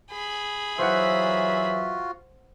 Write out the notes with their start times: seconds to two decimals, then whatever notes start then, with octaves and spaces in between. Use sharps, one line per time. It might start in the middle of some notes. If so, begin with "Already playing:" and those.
0.11 G#4 B5
0.79 E3 F#3 F4 F#4 C5 E5 F#5